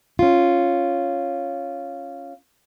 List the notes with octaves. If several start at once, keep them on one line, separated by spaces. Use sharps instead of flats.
C#4 F4